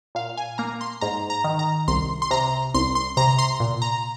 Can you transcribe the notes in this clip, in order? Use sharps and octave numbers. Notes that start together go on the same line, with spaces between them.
A#2 F5
G#5
A#3 A#5
C6
G#2 A#5
A#5
D#3
A#5
C2 C6
C6
C3 A#5
C2 C6
C6
C3 A#5
C6
A#2
A#5